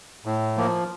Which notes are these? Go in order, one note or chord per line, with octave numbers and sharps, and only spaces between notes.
A2
F3 A#3